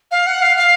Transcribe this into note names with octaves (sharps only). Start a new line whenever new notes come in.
F5
F#5
F5
F5